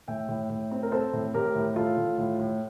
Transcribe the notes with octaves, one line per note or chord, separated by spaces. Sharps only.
A2 E5 G5
A2
A2
C4
A#4
C4 A4 C5
A2
A2 G4 A#4
A2
A2 F4 A4
A2
A2
A2